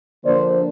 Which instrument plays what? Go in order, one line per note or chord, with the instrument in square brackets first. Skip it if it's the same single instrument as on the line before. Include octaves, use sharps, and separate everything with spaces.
[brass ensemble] D3 F3 A#3 D4 C5 D5